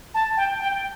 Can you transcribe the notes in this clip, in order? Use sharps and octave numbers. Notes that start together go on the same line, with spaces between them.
A5
G5
G5